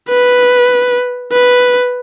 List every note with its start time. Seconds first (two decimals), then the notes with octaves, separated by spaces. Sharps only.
0.09 B4
1.33 B4